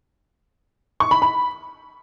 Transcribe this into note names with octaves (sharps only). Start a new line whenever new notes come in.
C#6
B5
B5